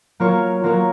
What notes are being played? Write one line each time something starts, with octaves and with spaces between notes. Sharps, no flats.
F#3 A#3 F4 A#4 C#5
F#3 A#3 F4 A#4 C#5